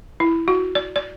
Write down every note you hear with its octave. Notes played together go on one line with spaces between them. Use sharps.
E4
F#4
D5
D5